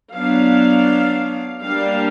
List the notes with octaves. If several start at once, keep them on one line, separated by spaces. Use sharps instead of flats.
F#3 B3 D4 F5
G3 A#3 D4 F5